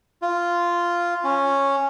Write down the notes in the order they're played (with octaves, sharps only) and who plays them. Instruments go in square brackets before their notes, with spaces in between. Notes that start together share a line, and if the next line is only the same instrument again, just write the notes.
[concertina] F4
C#4